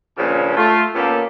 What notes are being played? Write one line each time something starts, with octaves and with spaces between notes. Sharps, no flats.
G2 A#2 C#3 F3 G3 C#4
A3 F4
A#2 A#3 B3 C#4 G4 A4